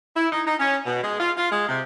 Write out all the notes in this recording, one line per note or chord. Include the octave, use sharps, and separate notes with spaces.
E4
D#4
D#4
C#4
B2
G#3
F4
F4
G#3
C3